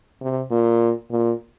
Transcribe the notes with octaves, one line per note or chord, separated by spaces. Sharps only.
C3
A#2
A#2